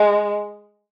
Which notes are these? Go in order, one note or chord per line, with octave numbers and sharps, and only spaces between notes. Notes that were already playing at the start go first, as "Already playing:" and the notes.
Already playing: G#3